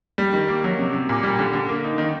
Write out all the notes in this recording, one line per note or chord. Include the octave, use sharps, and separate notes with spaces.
G3
D#3
A#3
F#3
C3
C3
A#2
G3
D3
D3
A#3
D#4
D#3